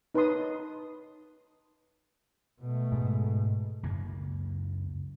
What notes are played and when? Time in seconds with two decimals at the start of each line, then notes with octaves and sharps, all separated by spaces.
0.15 D#4 B4 C#5 A5 C6 D#6
2.61 B2 A3
2.92 G#2
3.83 C#2 F#2 C#3 A#3